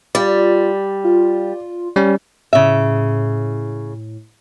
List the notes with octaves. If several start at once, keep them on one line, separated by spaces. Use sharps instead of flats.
G3 F4 D5
F4
G3 C#4
A2 C#3 E5